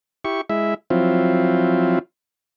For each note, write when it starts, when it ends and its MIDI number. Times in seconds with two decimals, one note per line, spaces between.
0.25 0.41 64
0.25 0.41 67
0.25 0.41 85
0.50 0.74 56
0.50 0.74 64
0.50 0.74 76
0.90 1.99 53
0.90 1.99 54
0.90 1.99 60
0.90 1.99 64
0.90 1.99 65